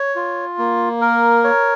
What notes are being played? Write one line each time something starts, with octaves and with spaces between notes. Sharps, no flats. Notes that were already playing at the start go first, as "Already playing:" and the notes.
Already playing: C#5
F4
A#3
A#4
C#5